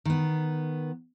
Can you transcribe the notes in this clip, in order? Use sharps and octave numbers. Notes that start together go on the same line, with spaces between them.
D#3 B3